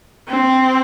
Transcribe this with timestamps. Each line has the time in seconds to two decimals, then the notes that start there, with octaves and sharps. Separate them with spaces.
0.28 C4